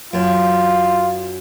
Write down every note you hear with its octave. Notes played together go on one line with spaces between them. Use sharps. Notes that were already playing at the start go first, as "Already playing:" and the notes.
F#2 F4